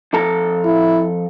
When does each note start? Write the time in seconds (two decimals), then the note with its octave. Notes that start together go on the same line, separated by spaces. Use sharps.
0.13 F2 A4 A#5
0.65 E4